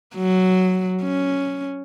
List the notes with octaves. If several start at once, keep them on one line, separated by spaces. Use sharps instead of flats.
F#3
C#4